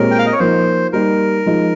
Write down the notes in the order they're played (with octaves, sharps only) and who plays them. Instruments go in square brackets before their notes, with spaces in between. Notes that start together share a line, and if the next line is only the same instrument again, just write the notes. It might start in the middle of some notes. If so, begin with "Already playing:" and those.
Already playing: [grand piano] A#2 G#3 C4 G4 C#5 [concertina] A#4
[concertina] G5
F5
D#5
C#5
[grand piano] F3 A#3 D#4 [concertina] C5
[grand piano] G3 A#3 D#4 G4 [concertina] A#4
[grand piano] F3 G#3 D#4